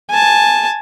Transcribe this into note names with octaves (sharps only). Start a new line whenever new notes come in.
G#5 A5